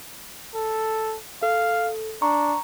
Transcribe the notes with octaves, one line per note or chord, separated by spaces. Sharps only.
A4
A4 F5
D4 A#5 C#6